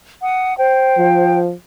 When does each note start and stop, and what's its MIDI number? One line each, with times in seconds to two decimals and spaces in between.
0.22 0.57 78
0.22 0.57 87
0.57 1.40 72
0.57 1.40 79
0.98 1.53 53